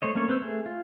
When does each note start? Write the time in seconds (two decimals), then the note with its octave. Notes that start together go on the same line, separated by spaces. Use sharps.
0.02 A3 C5 C#5 D#5
0.15 A3 A#3 C#4 A4 C#5
0.28 C4 B4 C5 E6
0.42 A3 G#4
0.66 F4